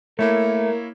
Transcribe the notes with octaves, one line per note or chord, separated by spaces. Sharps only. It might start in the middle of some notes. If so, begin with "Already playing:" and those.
A3 A#3 E4 A#4 C#5